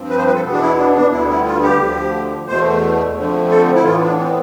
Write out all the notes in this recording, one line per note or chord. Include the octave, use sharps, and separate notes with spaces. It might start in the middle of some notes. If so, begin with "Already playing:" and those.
Already playing: G2 F3 C4
B4
C5
B4
A4
E2 B2 B3
D4
E4
D4
D4
D2 D3 G3 B3 E4
E4
F4
G4
D2 D3 F3
E2 B2 A3 C5
F2 D3 F3 A3
A4
E4
A2 E3 B3 F4
D4
C4